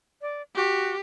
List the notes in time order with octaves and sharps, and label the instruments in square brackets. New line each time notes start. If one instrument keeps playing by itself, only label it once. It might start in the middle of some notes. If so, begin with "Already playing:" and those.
[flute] D5
[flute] F#4 [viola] G4